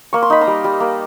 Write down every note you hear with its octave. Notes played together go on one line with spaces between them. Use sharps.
A#3 C#6
C6
D#4 B5
A#5 C6
G3
G3
A#3